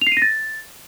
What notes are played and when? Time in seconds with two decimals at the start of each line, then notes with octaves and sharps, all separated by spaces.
0.01 F7
0.07 C7
0.12 D#7
0.17 A#6
0.22 A6